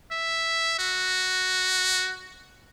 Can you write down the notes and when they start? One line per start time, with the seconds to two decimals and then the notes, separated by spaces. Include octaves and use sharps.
0.11 E5
0.79 F#4